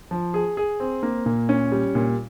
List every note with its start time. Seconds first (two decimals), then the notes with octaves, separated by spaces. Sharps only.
0.11 F3
0.34 G#4
0.57 G#4
0.80 C4
1.03 A#3
1.26 A#2
1.49 C#4
1.72 G3
1.95 A#2